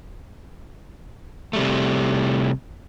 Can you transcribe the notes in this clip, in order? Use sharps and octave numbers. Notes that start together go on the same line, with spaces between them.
C3 G3 A3